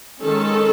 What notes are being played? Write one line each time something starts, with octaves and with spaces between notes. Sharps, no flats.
D#3 G#3 C#4 A4